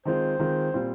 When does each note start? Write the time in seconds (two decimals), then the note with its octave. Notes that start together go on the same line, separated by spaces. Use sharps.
0.05 D#3 G#3 C4 F4 C5
0.40 D#3 G#3 C4 F4
0.74 A#2 G3 C4 F4